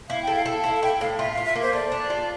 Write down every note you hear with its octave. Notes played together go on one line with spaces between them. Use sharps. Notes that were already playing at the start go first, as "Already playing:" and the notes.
E4 F5
A4 G5
F5
A4
E4 F5
F5
E4 G5
A2 F5
F4 E5
F4 F5
E5
A#3
C5
A3 D5
D4
F4